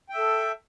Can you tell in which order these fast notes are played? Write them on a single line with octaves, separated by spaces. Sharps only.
G5 E5 A4